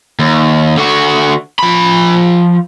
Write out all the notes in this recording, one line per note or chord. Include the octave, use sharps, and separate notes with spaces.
D#2
D3 F#4
F3 B5